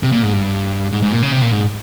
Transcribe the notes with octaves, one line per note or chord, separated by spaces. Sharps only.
C3
A#2
G#2
G2
G#2
G#2
A#2
C#3
C3
A#2
G#2